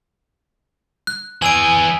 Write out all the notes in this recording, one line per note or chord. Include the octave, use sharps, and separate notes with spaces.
F#6
E3 G#4 G#5 E6 D7